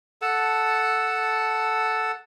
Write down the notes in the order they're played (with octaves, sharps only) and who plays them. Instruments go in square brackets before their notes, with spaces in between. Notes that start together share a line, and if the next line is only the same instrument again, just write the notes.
[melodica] A4 F#5 A5